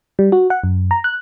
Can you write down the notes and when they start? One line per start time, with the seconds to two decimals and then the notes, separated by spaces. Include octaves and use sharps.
0.19 G3
0.32 F#4
0.50 F#5
0.64 F#2
0.91 A#5
1.04 F#6